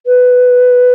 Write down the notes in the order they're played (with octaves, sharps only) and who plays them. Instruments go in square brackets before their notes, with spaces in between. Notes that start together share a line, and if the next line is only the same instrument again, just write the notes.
[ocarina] B4